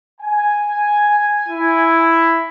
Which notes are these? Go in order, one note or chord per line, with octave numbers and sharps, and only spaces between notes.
G#5
E4